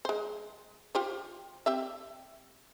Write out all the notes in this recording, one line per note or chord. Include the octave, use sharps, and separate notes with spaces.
G#3 C5
F4 G4 C5
C4 G4 E5